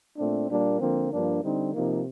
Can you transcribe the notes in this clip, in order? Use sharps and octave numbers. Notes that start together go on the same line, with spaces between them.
A#2 A3 C4 D4
A#2 G3 A#3 D4
D3 F3 A#3 C4
G2 F3 A#3 D4
D3 G3 C4 D#4
C3 F3 A#3 D#4